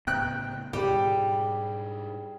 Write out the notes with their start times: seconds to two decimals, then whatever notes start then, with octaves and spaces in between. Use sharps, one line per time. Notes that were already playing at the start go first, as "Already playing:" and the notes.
0.07 A2 C#3 B3 G5 F#6
0.73 G#2 B2 G3 G4 G#4